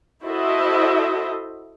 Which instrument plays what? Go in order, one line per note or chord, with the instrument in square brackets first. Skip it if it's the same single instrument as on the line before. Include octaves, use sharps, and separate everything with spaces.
[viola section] E4 F#4 A4 C5 D#5 E5